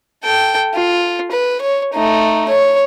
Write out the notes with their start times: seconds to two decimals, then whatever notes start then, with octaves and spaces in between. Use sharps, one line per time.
0.24 A4 G5
0.74 F4
1.32 B4
1.61 C#5
1.93 A3 D#4
2.49 C#5